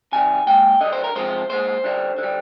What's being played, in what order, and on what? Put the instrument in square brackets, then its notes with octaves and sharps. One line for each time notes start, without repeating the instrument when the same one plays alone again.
[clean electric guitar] C3 D#3 G3 G#5
A#2 G#3 G5
D3 G3 D#5
C5
A#4
C3 F3 G#3 C5
A#2 G#3 C5
D3 G3
D3
G3